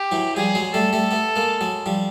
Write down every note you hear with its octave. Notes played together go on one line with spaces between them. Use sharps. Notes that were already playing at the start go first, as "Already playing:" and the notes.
Already playing: G4
E3 F#3
F3 G3 G#4
F#3 G#3
G3 A3 A4
G3 A3
A3 B3
G#3 A#3
F#3 G#3
F3 G3